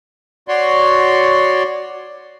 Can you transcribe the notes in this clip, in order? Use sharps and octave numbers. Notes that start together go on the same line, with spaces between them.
F#4 C#5 D5 C6